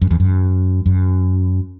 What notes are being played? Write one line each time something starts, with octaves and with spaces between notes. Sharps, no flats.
F#2
E2
F#2
F#2